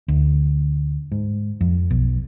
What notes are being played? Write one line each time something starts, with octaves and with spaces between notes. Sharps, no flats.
D2
G#2
F2
B1